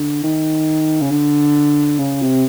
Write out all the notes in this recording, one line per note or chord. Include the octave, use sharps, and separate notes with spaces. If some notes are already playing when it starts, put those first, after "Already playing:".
Already playing: D3
D#3
C#3
D3
C#3
C3